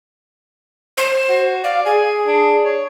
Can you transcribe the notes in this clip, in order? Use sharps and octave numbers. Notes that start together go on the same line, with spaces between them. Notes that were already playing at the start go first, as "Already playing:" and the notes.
C5
F#4
D5 F5
G#4 G#5
D4
C#5